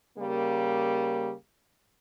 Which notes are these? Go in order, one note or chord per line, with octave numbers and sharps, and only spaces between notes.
C#3 G3 A#3